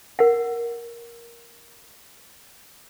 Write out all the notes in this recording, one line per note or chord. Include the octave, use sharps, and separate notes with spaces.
A#4 F#5